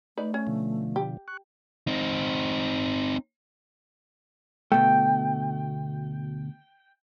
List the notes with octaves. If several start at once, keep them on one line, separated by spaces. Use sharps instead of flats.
A3 D#4 B4 D5
C#4
B2 D3 F3
G4
C#6 F#6
C4 D#4
D2 B2 A3 G5